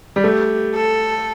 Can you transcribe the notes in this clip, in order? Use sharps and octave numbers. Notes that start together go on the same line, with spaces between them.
G3
A3 G4
A4